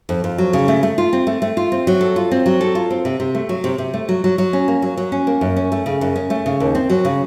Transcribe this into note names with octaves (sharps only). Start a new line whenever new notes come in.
F2
F2
F#3
C#3
A3
A3
F4
C4
A3
A3
F4
C4
F#3
A4
F4
C4
F#3
A4
F4
C4
C3
C3
A3
F#3
C3
C3
A3
F#3
F#3
F#3
C#4
A#3
F#3
F#3
C#4
A#3
F#2
C#4
A3
C#3
F#2
C#4
A3
C#3
D#2
C4
F#3
C#3